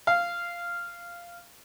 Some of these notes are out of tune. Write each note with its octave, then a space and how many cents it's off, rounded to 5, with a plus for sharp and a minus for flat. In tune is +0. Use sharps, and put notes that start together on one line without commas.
F5 -10